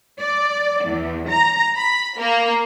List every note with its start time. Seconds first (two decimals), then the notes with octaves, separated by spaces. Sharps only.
0.21 D5
0.85 E2
1.29 A#5
1.76 B5
2.17 A#3